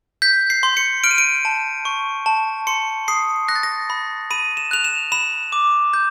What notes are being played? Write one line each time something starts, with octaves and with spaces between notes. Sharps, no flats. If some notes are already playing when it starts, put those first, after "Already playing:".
G6 B6
C7
C6
C#7
F6 D7
D#7
D7
A5
C#6
A5
C6 C#7
D#6 C7
F#6 A#6
A6
A#6
B5
B5 D#7
E7
F#6 F7
E7
B5 E7
D6
G6